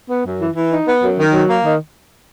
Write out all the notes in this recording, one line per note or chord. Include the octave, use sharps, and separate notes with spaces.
B3
F#2
E3
E3
D#4
B3
F#2
D#3
F#3
A#3
D#3